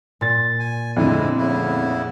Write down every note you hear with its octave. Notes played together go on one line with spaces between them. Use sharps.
A#2 A6
G#5
F2 A2 D3 G#3 E4
E2 C#3 E4